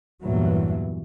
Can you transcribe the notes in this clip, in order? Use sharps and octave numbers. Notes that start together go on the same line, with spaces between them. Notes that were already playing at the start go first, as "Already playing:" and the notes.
E2 G2 A#2 E3 F#3